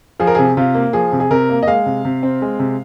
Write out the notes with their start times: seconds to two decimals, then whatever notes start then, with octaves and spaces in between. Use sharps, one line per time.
0.20 F3 G#4
0.27 A#4
0.35 C3 G#4
0.57 C3 F4
0.74 A#3
0.93 F3 G#4
1.12 C3
1.20 G#4
1.30 C3 A#4
1.50 A#3
1.63 D#5
1.67 G#3 F5
1.86 C3
2.05 C3
2.23 C4
2.42 G#3
2.59 C3